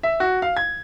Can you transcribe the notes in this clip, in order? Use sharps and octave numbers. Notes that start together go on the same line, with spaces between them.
E5
F#4
F5
G#6